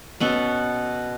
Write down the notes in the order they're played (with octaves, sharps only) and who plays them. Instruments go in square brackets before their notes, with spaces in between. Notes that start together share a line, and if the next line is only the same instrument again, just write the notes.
[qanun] B2 B3 C#4 A4